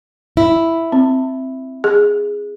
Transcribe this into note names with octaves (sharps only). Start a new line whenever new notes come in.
E4
C4
G#4